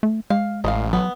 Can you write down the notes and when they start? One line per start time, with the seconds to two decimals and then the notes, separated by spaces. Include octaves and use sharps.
0.03 A3
0.30 G#3 F5
0.64 A1 D#5 F5
0.93 F#3 B3